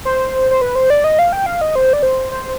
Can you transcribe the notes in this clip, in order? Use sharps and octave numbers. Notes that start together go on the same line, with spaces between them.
C5
C5
B4
C5
D5
D#5
F5
G5
F5
D#5
C5
D5
C5
C5